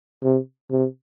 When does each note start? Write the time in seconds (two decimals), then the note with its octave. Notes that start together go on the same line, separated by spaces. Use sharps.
0.24 C3
0.71 C3